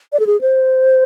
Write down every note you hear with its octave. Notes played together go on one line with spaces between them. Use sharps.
D5
A4
G#4
C5